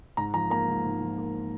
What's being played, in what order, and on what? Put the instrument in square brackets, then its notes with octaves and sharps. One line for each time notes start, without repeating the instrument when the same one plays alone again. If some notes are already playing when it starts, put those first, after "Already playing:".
[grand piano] G#2 A#5
F3 A#5
A#3 A#5
G#2
G#2
F3
A#3